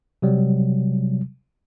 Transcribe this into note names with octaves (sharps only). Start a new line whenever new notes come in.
C3 F#3 G3